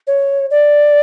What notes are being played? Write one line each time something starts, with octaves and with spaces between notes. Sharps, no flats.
C#5
D5